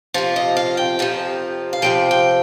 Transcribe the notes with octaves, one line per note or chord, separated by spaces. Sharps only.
F2 C3 F3 F4
D#5
F5
G5
F2 C3 F3
F5
F2 C3 F3 G5
G5